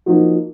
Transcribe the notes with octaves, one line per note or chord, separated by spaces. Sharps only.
F3 A#3 D#4 F#4